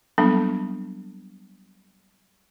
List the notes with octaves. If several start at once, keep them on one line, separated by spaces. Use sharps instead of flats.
F#3 G3 A#3 B3 D4 A4